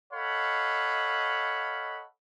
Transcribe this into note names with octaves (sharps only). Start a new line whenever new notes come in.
A4 C#5 D#5 F5 F#5 B5